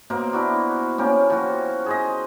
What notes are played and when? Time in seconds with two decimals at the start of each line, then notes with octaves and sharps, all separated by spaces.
0.10 B2 A#3 C5 A#5
0.33 D4 E4 F#4 D5
0.98 A#3 C#4 G4
1.30 F3 F#4
1.86 G#4 C5 D#5